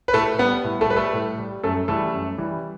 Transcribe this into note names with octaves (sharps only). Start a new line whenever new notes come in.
B4
A2 A3 A4
G3 B3 B4
A2
A3 A4
G3 B4
A3 A4
A2
G3
F#2 A3 A4
E3 G3 A3 A4
F#2
E3 G3